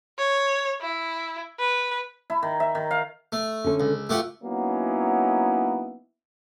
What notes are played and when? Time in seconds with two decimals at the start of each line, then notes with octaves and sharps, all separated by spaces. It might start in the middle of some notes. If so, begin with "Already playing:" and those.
0.19 C#5
0.81 E4
1.59 B4
2.30 E4
2.43 D#3
2.60 E5
2.75 D#3
2.91 F5
3.32 A3
3.64 D3 C#4 A4
3.80 C#2
4.09 A3 F4 G4 B4 F#5
4.42 F#3 A#3 B3 C#4 D#4 E4